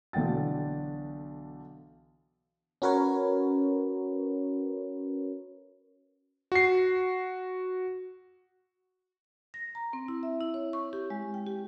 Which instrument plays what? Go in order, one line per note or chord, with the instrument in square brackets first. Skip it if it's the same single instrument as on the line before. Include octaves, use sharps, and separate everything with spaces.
[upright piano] B1 D3 E3 G5 A6
[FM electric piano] C#4 F#4 A#4 B4 C#5
[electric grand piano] F#4 C7
[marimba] A#6
A#5
C4
E4
E5
E4
C#5
C#6
G4
G#3
G5
G4